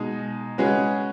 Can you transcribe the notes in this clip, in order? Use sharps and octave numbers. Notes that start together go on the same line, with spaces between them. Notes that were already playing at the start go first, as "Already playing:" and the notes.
Already playing: B2 G#3 D#4
C#3 G#3 C#4 F#4 B4